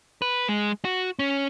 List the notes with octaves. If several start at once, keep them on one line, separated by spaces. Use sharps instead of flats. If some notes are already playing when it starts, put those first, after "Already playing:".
B4
G#3
F#4
C#4